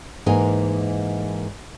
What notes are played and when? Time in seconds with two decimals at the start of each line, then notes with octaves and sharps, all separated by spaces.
0.26 G#2 E3 A#3 D#4 G#5